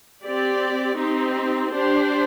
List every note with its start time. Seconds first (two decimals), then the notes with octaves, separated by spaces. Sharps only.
0.22 C4 G4 D5
0.97 C4 D#4 G4
1.72 D4 G4 C5